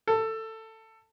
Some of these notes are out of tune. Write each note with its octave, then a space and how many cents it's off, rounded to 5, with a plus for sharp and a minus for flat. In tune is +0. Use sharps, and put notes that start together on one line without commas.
A4 +15